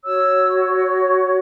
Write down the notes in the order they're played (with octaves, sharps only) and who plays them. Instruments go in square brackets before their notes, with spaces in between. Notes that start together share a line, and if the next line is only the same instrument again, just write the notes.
[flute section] F#4 C#5 E6